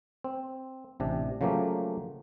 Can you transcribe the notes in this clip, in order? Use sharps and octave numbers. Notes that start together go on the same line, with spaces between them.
C4
A1 C3 D4
C#3 F3 F#3 A3 A#3 G4